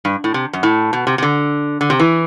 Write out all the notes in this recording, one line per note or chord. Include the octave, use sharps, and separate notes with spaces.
G2
A2
C3
F#2
A2
B2
C3
C3
D3
D3
C3
E3